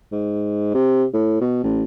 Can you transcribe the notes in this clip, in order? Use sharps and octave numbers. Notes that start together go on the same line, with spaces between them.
G#2
C3
A2
B2
A1